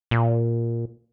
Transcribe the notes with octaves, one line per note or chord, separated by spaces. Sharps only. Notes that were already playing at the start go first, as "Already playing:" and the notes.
A#2